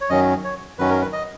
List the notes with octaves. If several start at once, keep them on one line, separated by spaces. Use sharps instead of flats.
C#5
F#2 D#3 F#3 C#4 D#5
C#5
F#2 D#3 F#3 C#4 B4
A#4
B4
D#5